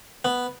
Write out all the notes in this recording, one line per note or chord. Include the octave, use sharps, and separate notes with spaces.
B3